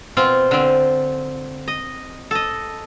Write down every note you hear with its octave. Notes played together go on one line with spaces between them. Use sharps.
B2 C4 F4
D3 C4
D#5
A4 D#5